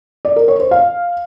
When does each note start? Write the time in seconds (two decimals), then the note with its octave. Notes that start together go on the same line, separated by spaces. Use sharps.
0.25 D5
0.36 A#4
0.48 C#5
0.60 C5
0.71 F5